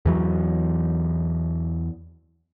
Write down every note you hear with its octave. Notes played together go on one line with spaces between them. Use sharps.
E2 E3 F#3